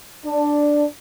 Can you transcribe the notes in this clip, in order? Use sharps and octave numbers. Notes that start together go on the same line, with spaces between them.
D4